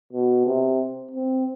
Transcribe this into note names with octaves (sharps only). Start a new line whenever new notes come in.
B2
C3
C4